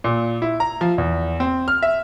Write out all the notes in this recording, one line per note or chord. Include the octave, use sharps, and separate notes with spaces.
A#2
E4
A#5
F3
E2
C4
F6
E5